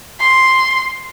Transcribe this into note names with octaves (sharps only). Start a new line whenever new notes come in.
C6